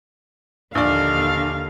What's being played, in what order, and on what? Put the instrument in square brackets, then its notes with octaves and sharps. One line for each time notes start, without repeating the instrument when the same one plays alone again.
[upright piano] A#1 D5 [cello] D#2 D3 [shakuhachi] D4 [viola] F5